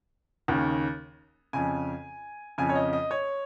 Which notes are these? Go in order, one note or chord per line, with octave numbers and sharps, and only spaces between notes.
D#2 C#3
F2 C#3 G#5
F2 C#3 G#5
C#5
D#5
D#5
C#5